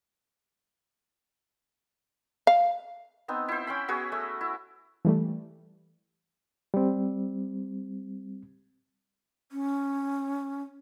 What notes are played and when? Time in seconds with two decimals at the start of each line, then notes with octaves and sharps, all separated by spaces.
2.47 F5
3.28 B3 C4 D#4
3.48 E4 C5
3.67 C#4 G5 B5
3.88 B3 F#4 G#4 C#5
4.12 A3
4.41 E4
5.05 E3 G3 A3
6.74 G3 C4
9.51 C#4